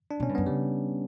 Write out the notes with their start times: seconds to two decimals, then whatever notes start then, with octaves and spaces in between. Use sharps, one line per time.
0.11 D4
0.20 B2 C#4
0.29 G2
0.35 F#2 B3
0.46 C#3 G3